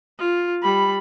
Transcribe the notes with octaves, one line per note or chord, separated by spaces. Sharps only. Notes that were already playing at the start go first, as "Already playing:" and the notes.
F4
G3 B5